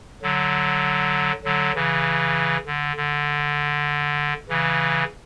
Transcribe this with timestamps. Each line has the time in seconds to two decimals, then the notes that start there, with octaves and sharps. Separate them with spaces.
0.23 D3 F#3
1.44 D3 F#3
1.75 C#3 E3
2.66 D3
2.97 D3
4.49 C#3 E3